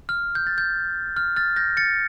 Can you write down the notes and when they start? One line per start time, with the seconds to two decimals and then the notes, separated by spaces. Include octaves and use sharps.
0.09 F6
0.35 G6
0.47 A6
0.58 G6
1.17 F6
1.36 F6 A6
1.56 G6 A#6
1.77 A6 C#7